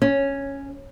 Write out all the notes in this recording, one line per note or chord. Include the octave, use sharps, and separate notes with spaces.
C#4